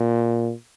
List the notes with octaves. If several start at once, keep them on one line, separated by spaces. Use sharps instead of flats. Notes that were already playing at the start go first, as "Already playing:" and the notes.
Already playing: A#2